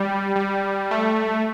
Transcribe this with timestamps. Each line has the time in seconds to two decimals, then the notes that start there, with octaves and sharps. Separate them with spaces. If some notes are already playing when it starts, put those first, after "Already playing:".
Already playing: G3
0.36 G3
0.91 A3